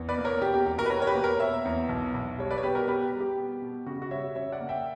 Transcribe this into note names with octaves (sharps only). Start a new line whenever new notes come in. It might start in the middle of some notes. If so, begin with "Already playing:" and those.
Already playing: E2
B4 D5
A#3
A#4 C#5
B2 G4
G4
E2 G4
F#4 A#4
B4
B2 A#4 C#5
C#5
G4 B4
A#3
A#4 C#5
B2 C#5 E5
E2
B1
B1
G3 C#5
B4 D5
C#5
B3 G4 B4
F#4 A#4
B2 G4 B4
G3
G4
B3
B2
C#3 F#4
F#4
G3 C#5 E5
C#3 C#5 E5
D5 F#5
A#3
E5 G5